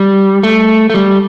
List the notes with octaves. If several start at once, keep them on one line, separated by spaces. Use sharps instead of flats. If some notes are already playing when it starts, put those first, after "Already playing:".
Already playing: G3
A3
A3
G3